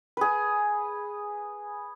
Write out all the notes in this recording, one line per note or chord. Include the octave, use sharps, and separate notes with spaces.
G#4 B4